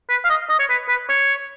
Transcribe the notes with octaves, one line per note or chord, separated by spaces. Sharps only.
B4
F5
D#5
D#5
C#5
B4
B4
C#5